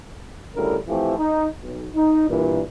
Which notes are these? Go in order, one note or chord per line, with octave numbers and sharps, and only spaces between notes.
D2 C#3 G3 A3 E4 A#4
E3 F3 A3 C4 E4 G4
D#4
B1
D#4
G2 A#2 E3